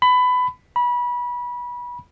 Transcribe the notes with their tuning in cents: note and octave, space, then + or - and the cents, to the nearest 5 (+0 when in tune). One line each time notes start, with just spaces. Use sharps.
B5 +20
B5 -25